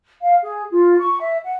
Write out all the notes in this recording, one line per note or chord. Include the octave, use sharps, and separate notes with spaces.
F5
G#4
F4
C#6
E5
F#5